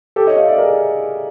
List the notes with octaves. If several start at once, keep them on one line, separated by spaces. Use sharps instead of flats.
G4 A4
C#5 D#5
D#5 F5
D5 E5
G#4 A#4